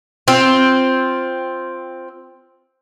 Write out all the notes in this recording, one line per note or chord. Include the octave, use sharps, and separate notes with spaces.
C4 F4